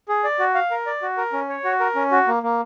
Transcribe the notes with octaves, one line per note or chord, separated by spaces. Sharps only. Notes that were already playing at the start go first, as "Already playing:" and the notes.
G#4
D5
F#4
F5
A#4
D5
F#4
A#4
C#4
C#5
F#4
A#4
C#4
F#4
A#3
A#3